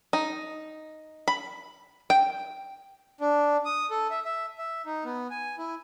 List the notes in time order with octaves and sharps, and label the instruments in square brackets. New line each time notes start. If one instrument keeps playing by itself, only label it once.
[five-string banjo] D#4
B5
G5
[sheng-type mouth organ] D4
D#6
A4
E5
E5
E5
D#4
B3
G#5
E4